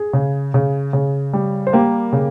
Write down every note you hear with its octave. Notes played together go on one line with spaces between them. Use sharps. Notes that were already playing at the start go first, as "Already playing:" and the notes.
Already playing: G#4
C#3
C#3
C#3
G3
C5
A#3 G4 A#4
C#3